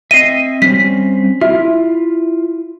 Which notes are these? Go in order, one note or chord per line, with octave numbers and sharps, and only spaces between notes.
C4 D#5 E5 C7 D#7
G3 C4 C#4 B6
E4 F4 E5